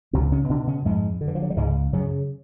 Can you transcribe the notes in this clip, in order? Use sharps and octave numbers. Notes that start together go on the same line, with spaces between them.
C#2 C3 C4
C#3 C#4
B2 D3 D4
C#3 C#4
F2 G#2 G#3
D3
E3
F3
F#3
G3
C#2 G#2 G#3
F#2 C#3 F#3